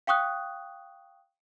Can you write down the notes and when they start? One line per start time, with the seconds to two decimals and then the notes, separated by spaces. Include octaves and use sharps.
0.07 F5 G5 C#6 D#6 F#6